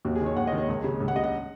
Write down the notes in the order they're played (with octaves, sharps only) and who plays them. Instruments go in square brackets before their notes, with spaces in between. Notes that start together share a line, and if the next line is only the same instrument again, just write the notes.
[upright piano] D#2 F#4
G#4
D#3
C#5
D#2 F#5
D#5
D#3
C#5
C#2
C#3
C#2
F#5
C#3 D#5
F#5